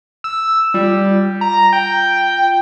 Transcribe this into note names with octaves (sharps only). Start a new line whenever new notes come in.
E6
G3 F4
A#5
G5